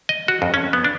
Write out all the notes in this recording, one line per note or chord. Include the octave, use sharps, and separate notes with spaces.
D#5
F#4
F2
C#4
B3
D4